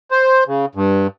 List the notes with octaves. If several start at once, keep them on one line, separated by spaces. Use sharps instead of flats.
C5
C#3
G2